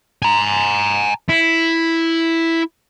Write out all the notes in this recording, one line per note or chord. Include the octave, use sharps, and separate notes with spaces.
G#5 A#5
E4